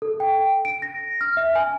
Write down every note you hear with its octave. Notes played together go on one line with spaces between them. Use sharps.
A4
G5
D7
A#6
F6
E5
G#5